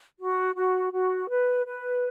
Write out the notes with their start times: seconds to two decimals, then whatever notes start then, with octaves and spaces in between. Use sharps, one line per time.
0.19 F#4
0.55 F#4
0.92 F#4
1.29 B4
1.66 B4